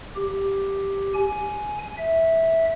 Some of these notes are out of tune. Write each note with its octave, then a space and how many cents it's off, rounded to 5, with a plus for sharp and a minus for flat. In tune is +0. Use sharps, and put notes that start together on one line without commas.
G4 +0
G#5 +15
E5 -10